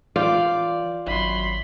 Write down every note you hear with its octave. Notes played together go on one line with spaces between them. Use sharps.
E3 F4 D5 F5 G5
G#1 F#2 B5 C6